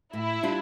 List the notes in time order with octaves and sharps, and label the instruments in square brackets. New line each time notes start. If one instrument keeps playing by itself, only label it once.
[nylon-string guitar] A2 [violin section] E4
[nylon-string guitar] G3 D4 F4